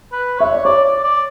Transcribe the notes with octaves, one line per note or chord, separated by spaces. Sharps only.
B4
C#5 E5
D5
C#5 D5
D5
D5